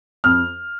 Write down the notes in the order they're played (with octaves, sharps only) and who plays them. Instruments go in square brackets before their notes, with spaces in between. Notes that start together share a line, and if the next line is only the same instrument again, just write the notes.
[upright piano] F2 F6